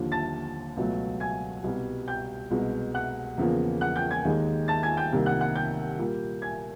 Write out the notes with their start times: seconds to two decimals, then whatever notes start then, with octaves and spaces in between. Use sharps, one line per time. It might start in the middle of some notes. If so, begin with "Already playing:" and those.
Already playing: D#2 D3 F3
0.12 A5 A6
0.77 C#2 B2 F#3 A3
1.20 G#5 G#6
1.63 C2 B2 G3
2.08 G5 G6
2.51 C2 B2 G#3
2.94 F#5 F#6
3.38 E2 C#3 F3 A#3
3.81 F#5 F#6
3.96 G5 G6
4.11 G#5 G#6
4.25 D#2 D#3 G#3
4.68 A5 A6
4.83 G#5 G#6
4.97 G5 G6
5.12 C2 C3 D#3 G3 A#3
5.26 F#5 F#6
5.41 F#5 F#6
5.55 G5 G6
5.99 A#2 G3 A#3
6.42 G#5 G#6